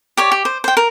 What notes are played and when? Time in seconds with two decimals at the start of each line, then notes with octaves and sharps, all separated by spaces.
0.17 G4 C#5 D5
0.32 G4
0.45 C5
0.64 C5 G5
0.77 A#4